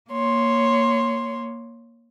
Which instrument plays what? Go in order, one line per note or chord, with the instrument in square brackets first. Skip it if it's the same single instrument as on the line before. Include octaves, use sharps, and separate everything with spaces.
[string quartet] A#3 C#5 C6